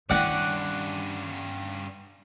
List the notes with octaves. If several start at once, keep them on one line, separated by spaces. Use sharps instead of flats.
G2 D#3 C#4 E4 D5 F#5